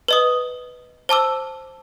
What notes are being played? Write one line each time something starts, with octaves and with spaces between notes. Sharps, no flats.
B4 D#5 D#6
C5 A5 D6 E6